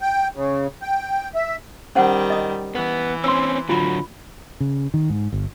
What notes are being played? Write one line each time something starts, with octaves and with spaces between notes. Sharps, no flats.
G5
C#3
G5
E5
D#3 G3 C#4 C5 F#5
D#5 D#6
E3 B3
C4 C#4 C6 E6
D3 F#3 F4 B5
C#3
D#3
G#2
G1